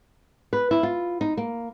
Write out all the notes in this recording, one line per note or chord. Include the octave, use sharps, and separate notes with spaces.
B4
E4
F4
D#4
A#3